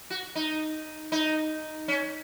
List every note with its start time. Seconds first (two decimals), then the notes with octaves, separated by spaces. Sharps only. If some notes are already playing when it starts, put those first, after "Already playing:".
0.10 F#4
0.35 D#4
1.12 D#4
1.88 C#4